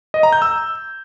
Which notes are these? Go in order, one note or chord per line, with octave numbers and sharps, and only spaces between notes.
D#5
A#5
G6
E6